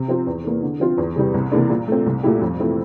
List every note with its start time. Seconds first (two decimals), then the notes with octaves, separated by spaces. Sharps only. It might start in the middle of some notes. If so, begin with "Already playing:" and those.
Already playing: C3
0.08 F3 C4 F4
0.27 E2
0.44 E3 A#3
0.63 D3
0.80 F3 C4 F4
0.98 E2
1.16 C3 E3 G3
1.34 C2
1.52 C3 E3 A#3 D4
1.70 A#2
1.87 A3 C4
2.06 C2
2.23 A#2 A3 E4 G4
2.41 F2
2.59 E3 A3 C4 E4